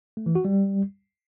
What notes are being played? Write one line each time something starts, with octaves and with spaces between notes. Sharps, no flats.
A3
E3
F#4
G3